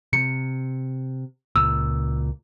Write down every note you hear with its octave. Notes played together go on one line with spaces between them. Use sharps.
C3 C#7
C#2 A#2 E6